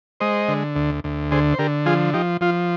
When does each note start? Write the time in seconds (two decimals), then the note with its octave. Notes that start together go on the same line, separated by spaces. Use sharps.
0.20 G#3 C5 D#5
0.49 D3
0.76 D2
1.04 D2
1.31 D3 G#4 C5
1.53 C5
1.59 D3 G4 A#4
1.86 F3 F4 G#4
2.14 F3 D#4 G4
2.41 F3 F4